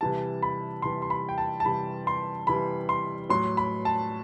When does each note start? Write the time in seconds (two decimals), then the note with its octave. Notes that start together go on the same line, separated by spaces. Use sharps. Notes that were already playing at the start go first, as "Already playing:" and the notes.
0.01 C3 E3 G3 A5
0.42 B5
0.82 C3 E3 G3 C6
1.02 C6
1.10 B5
1.29 G5
1.38 A5
1.60 A5
1.65 C3 E3 G3 B5
2.07 C6
2.47 C3 E3 G3 B5
2.89 C6
3.29 A2 F#3 C6
3.57 B5
3.85 A5